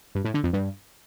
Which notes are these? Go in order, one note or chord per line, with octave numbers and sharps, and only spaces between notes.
G2
A2
D3
F2
G2